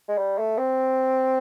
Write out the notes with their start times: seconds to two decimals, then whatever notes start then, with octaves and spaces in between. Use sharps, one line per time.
0.08 G#3
0.18 G3
0.38 A3
0.57 C4